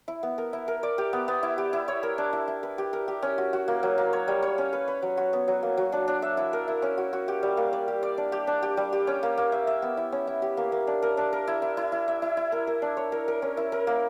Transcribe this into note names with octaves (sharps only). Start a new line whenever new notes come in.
E4
B3
A#4
E4
A#4
D5
G4
B3
B3
E4
G4
E4
C#5
A#4
D4
E4
E4
B4
G4
A#4
G4
C#4
F#4
F#4
A#3
F#3
A#3
C#5
G3
C#5
C#4
B4
B4
F#3
F#4
B3
F#3
A#3
F#3
D4
D4
E5
E4
A#4
E4
C#4
F#4
F#4
G4
G3
A#3
D5
G4
D5
D4
G4
D4
G4
G3
G4
C#4
A#3
A#3
E5
E5
B3
E4
C#4
E4
G4
A#3
A#3
D4
A#4
D4
A#4
E4
E4
E4
E4
E5
E4
E4
A#4
A#4
D4
C#5
A#4
A#4
C#4
E4
A#4
A#3